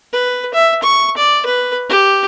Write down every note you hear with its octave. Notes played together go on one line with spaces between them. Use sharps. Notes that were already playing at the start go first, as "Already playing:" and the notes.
B4
E5
C#6
D5
B4
G4